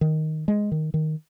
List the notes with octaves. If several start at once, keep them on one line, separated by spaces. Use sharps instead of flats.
D#3
G#3
D#3
D#3